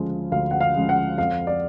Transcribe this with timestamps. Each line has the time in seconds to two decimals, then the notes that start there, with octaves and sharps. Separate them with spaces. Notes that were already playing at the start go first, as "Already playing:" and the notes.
Already playing: D2 C#3 F3 G#3
0.32 D2 F5
0.51 F#5
0.61 F5
0.75 C#3 F3 G#3
0.89 F#5
1.18 F2 F5
1.47 D5